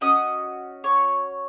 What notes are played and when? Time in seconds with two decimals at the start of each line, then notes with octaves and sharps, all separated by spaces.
0.01 C#4 F#4 D#5 D#6
0.84 C#5 C#6